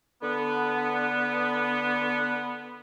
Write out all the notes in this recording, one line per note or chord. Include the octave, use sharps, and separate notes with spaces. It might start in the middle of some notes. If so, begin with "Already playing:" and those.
D3 B3